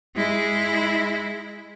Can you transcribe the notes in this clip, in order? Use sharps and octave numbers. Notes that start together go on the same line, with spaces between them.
G#3 E4